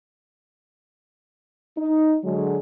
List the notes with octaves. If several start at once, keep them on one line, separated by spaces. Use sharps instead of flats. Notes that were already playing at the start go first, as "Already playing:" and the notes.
D#4
D3 F#3 G#3